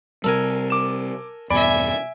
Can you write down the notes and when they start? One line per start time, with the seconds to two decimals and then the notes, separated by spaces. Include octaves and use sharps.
0.24 C3 G3 A4 A#4 G#5
0.70 D6 E7
1.50 E2 G2 B2 D5 E5 G#5 B5 D7